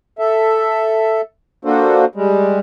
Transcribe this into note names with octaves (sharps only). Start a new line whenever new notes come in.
A4 E5
A#3 D4 F4 F#4 A4 C5
G3 G#3